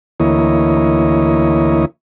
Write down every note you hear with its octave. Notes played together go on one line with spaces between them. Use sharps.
D2 E3 A#3 E4 C#5 D#5